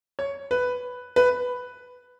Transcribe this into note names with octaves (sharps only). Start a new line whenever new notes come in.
C#5
B4
B4